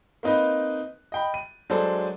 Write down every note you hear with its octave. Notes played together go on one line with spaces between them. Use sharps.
A#3 C4 D#4 B4 D#5
D#5 G5 B5
D#7
F#3 G#3 D4 A4 C5